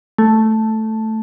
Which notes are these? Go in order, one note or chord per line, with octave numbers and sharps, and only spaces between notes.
A3